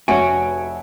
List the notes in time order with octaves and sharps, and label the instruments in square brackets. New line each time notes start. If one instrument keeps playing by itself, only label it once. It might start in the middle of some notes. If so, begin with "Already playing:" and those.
[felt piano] F1 E5 D7 [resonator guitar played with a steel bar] F#4 [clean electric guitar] C#5 G#5